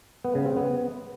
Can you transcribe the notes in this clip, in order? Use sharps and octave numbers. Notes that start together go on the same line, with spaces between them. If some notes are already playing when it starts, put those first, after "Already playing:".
B3
C#3
C4
B3